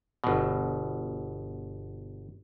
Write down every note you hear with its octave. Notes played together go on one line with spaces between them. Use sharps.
G1 B2